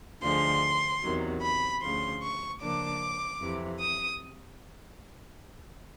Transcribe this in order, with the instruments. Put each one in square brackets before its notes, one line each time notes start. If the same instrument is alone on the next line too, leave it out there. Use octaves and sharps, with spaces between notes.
[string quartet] D2 D3 F3 G#3 C6
E2 C3 D#3 F#3
B5
D2 C#3 F3 C6
C#6
C#3 F3 A#3 D4 D6
F2 C3 E3
D#6